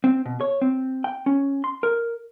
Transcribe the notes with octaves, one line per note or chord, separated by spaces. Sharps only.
C4
B2
C#5
C4
G5
C#4
C6
A#4